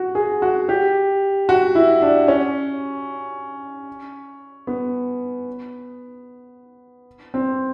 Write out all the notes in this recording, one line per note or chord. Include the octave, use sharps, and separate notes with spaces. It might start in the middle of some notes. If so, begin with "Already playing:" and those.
Already playing: F#4
G#4
F#4
G4
F#4
E4
D4
C#4
B3
C4